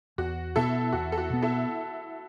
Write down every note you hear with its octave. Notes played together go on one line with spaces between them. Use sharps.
E2 F#4
B2 B3 E4 A4
E2 F#4
A4
F#4
B2 B3
E4 A4